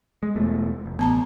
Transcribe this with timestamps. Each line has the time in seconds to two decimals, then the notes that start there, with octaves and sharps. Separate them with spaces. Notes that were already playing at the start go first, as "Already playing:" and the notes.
0.23 G#3
0.36 E1 E2 A3
0.86 F1
0.99 A1 B3 A5 A#5